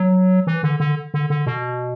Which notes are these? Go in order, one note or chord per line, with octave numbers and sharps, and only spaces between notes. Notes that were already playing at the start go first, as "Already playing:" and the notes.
Already playing: F#3
E3
D3
D3
D3
D3
B2